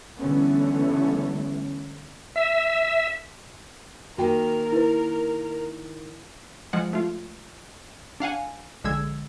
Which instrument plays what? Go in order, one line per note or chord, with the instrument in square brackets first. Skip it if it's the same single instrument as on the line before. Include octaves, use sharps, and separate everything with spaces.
[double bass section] D3 E3 G3 A3 B3 C#4
[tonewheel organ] E5
[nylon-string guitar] D#3 A#3 [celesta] F#4 G5 [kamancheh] A#4
[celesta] E4 B4
[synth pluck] F3 G#3 F#5
A3 F4
D4 F5 F#5 G#5
A#1 D3 G#3 E6 G#6